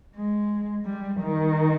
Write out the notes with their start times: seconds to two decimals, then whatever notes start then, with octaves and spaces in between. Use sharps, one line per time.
0.16 G#3
0.86 G3
1.21 D#3